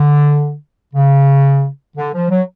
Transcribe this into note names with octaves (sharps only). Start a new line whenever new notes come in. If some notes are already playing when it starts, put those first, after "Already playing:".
Already playing: D3
C#3
D3
F3
F#3